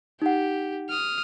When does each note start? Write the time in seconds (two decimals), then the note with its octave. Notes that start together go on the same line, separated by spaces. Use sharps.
0.22 D#4 G4 F#5
0.89 D#6 F6